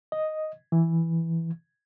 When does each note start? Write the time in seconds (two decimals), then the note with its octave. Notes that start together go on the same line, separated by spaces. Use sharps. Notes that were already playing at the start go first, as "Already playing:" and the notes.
0.12 D#5
0.72 E3